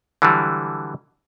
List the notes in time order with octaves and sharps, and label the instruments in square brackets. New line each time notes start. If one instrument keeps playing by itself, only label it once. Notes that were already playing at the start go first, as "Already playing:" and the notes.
[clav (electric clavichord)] D3 E3 F#3 G3